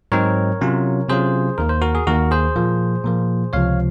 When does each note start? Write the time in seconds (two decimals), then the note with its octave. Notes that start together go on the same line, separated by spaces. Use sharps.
0.12 G#2 F#3 C4 D#4 A#4 C#5
0.61 C3 F#3 C#4 F4
1.09 C3 F#3 C#4 F4 G#4 C5
1.58 D#2 D#3 A#3 A#4
1.69 C5
1.82 F#4 A#4
1.95 G#4
2.07 D#2 D#3 A#3 F#4 A#4
2.31 G#4 C5
2.56 A#2 F3 A#3
3.04 A#2 F3 A#3
3.53 C#2 C3 F3 C#5 F5